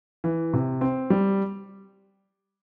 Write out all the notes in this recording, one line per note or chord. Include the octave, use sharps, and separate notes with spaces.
E3
C3
C4
G3